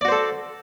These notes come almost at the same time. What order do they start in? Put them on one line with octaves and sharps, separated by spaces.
D5 F#4 C5 A4